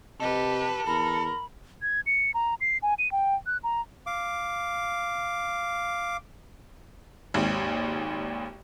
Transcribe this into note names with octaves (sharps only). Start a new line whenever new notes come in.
C3 G4 A4 B4 D#5
E2 A#4 B5
G#6
C#7
A#5
C7
G#5
D#7
G5
F#6
A#5
F5 D6
G#1 D#2